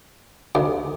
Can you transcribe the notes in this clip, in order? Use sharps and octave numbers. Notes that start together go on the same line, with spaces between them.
D2